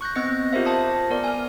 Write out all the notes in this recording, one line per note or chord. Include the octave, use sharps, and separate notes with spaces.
C#6 F#6 G6 A#6
B3 C4 D#5 A#6 C#7
F4 G4 A#4 C5 E5
C5 A5 D#6 A#6
B3 A#4 D5
G#5 F6